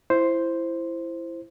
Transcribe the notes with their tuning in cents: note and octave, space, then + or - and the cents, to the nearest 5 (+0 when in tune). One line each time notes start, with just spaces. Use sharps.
E4 +15 C5 +0